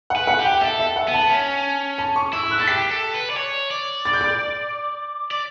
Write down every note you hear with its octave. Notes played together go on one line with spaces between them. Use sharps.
F#5
B4
F#5
G4
G5
A4 E5
E5
F#5
B3
A5
C#4
A5
C#6
E4 E6
E6
F#6
A4 A6
G4 B6
A4
B4
D5
C#5
D5
A6
G6
A6
D5